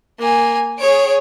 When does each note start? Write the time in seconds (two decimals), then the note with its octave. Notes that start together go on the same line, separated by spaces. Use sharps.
0.19 A#3 G#5
0.79 G#4 C#5 D7